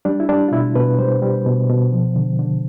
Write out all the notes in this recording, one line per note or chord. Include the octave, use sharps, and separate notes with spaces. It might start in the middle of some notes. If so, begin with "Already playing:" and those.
G3 D4
E4
G3 D4
F4
B2 E4
B2 B4
G3 C5
G3
B2
B2
F3
D3
D3